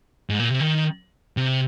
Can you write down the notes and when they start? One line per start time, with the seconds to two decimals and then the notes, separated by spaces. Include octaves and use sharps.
0.30 G#2
0.40 A#2
0.50 C3
0.61 D#3
1.37 C3